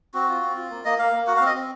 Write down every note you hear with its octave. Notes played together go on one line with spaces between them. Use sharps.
C4 F#4
F4
C4
F4
A#3
A#3 D#5
A#3 F5
A#3
F#4 F#5
F5
C4
D#5
C4